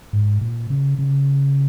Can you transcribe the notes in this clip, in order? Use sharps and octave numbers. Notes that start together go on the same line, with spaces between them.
G#2
A#2
C#3
C#3